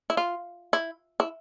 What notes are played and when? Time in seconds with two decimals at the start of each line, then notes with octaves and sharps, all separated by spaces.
0.10 E4
0.17 F4
0.73 E4
1.20 E4